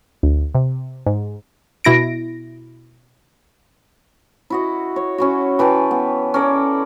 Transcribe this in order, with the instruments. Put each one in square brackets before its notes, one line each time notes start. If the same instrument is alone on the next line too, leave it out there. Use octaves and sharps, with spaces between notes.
[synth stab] D2
C3
G#2
[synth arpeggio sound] B2 E4 A#6 D7
[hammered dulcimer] E4 F#4 D#5
C#5
C#4 E4 F#4
E3 B4 G5 A5
B3
C#4 A4 A#4 D5